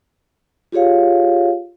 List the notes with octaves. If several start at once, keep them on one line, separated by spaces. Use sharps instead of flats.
F4 G4 G#4 C#5 F5